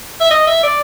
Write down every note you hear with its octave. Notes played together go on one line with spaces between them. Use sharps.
E5
D#5
E5
D5